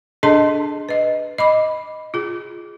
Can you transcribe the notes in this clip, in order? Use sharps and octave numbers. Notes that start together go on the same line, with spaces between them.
D4 G#4 A4 D#5 A5 C6
B4 D#5
D#5 B5 D6
F4 G#4